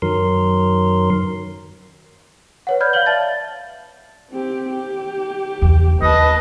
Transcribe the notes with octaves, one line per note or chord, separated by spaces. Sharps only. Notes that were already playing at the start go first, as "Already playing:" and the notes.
F#2 D#3 F#3 A#4 C6
B4 C#5 F#5
D5 B5 F6 G6 G#6
F5 F6 G6 F#7 G7
D5 E5 A5 A6
C4 G4
G4
E2 D3
D#2 B4 D#5 A5